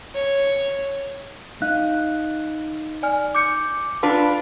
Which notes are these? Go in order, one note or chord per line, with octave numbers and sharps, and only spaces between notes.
C#5
D#4 F5 F#6
D5 G#5 F6
D6 G6 C#7
D4 F4 B4 A5